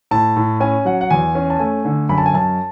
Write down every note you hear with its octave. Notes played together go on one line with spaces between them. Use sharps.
A2 A5
A2
C#4 G#5
F#3 F#5
F#5
E2 G#5
C#4
A5
A3 G#5
D3
F#2 B5
A5
G#5
F#2 A5